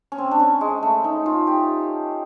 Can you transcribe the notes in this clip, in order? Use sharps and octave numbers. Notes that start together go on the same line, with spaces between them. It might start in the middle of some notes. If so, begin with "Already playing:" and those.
C#4
C4
D4
C#4
G#3
A3
D#4
F4
G4